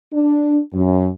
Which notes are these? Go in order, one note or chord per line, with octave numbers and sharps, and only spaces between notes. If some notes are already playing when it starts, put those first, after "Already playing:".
D4
F#2